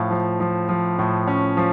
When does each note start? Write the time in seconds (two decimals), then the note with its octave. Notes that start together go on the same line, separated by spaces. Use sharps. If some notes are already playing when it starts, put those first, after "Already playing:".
Already playing: A2 F3 F5
0.11 F3
0.40 F3
0.69 F3
0.99 A2
1.28 C#4
1.57 F3